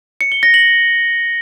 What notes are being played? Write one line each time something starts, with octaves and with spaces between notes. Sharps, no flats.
C#7
G7
A#6
F#7